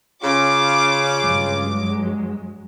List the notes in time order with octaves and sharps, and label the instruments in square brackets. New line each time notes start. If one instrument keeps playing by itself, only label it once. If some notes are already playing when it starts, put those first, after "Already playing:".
[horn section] C#3 F4 [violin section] D6
[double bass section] G2 F#3 G#3